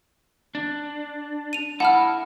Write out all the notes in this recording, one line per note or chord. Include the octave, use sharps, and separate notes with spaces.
D4
D#7 F7
E4 F#5 A5 B5 F6